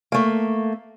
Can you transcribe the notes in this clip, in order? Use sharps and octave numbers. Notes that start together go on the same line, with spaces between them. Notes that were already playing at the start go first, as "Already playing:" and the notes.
A3 A#3